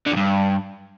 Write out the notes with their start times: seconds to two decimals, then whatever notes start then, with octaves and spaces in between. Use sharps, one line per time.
0.07 D3
0.12 F2
0.17 G2